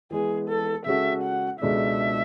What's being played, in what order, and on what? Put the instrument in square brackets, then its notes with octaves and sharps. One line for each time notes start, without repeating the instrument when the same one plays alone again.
[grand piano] E3 G#3 B3 [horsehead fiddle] G#4
[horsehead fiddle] A4
[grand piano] C#3 G#3 C#4 F#4 A4 [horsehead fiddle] E5
[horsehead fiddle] F#5
[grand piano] C#2 B2 G#3 D4 A4 [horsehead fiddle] E5